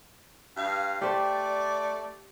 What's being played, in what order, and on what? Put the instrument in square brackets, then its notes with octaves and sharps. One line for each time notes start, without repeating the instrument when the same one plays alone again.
[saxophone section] G2 F5
[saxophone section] A3 D5 [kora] G4 C5